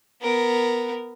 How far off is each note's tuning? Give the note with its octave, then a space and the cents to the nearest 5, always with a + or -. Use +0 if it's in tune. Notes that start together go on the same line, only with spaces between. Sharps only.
B3 +0 A#4 +0